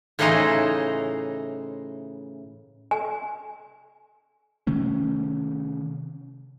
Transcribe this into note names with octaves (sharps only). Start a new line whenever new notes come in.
A2 C#3 E3 D#4 C5 D#5
G#5
C3 D#3 A3 C#4